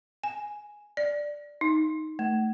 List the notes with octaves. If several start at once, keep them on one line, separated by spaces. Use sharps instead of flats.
G#5
D5
D#4
A3